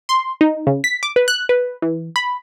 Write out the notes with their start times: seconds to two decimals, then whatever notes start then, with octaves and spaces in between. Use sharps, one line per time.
0.09 C6
0.41 D#4
0.67 C#3
0.84 B6
1.03 D6
1.16 B4
1.28 F#6
1.49 B4
1.82 E3
2.16 B5